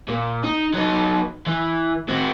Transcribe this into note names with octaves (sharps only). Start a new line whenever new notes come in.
A#2
D#4
F#3 D#4
E3
C4 F#4